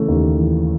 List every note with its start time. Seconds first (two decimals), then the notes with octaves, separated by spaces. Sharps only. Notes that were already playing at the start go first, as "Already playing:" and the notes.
Already playing: C#3 E3 A3
0.08 D#2
0.38 E3